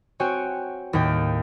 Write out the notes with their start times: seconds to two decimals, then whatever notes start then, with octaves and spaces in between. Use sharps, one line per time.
0.20 C4 F#4 C#5 G5 G#5
0.93 D#2 A2 A#3 G5